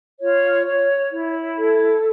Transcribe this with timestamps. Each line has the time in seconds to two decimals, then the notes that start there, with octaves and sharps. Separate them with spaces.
0.20 F4 C#5
0.66 C#5
1.11 E4
1.56 A4